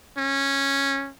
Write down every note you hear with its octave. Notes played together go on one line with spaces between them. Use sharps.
C#4